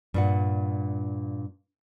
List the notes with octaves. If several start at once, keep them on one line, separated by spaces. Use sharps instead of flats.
G2 A#2 F#5